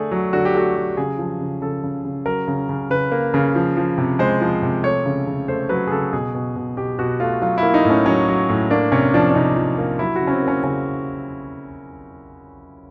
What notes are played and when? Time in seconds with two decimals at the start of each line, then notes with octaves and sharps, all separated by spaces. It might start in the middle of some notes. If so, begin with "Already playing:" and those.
Already playing: D3 A3 G#4
0.11 F#3
0.33 D3 F#4
0.45 G4
0.54 A3 F#4
0.76 F#3
0.97 C#3 G#4
1.19 F3
1.41 C#3
1.61 C#3 A4
1.84 C#3
2.05 C#3
2.26 F#3 A#4
2.48 C#3
2.69 C#3
2.90 C#3 B4
3.12 A#3
3.34 C#3
3.55 F3
3.77 F3
3.98 C3
4.19 G#3 C5
4.41 F3
4.62 C3
4.84 A3 C#5
5.05 C#3
5.27 C#3
5.48 A3 C5
5.69 F#3 B4
5.87 G#4
5.91 C#3 A4
6.13 B2 G#4
6.35 B2
6.56 B2
6.77 B2 G4
6.99 B2 F#4
7.20 A3 F4
7.42 F#3 F4
7.58 E4
7.63 A#3
7.74 D#4
7.85 A2
7.90 C#4
8.06 F#3 C#4
8.28 F#3
8.49 A2
8.70 A#3 D4
8.92 C3 C#4
9.14 F3 D4
9.31 D4
9.35 C3 D#4
9.57 F3
9.78 A#3
9.99 F#3 E4
10.16 F#4
10.21 C#3
10.27 C#4
10.31 C4
10.43 A#3 C#4
10.64 C#3 C#4